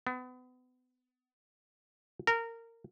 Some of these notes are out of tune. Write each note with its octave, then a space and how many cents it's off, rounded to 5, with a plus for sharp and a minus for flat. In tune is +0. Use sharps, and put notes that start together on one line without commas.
B3 +35
A#4 -20